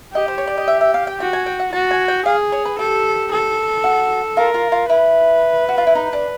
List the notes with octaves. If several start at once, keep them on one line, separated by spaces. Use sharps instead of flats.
G4 D#5
C5
C#5
D5
D#5
E5
E5
F5
G5
F#4 G5
G#5
G5
F#5
F#4 A5
G#5
G5
G#4 F5
C#5
B4
G4 A4
A4
F#4
F4 A#4
F4
F4
E4 B4
F#4
F4
E4
D#4
D4